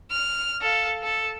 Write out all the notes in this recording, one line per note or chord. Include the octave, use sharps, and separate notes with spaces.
F6
A4 F5
A4